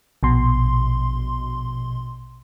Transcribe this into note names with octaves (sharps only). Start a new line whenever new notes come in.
A#1 B2 C6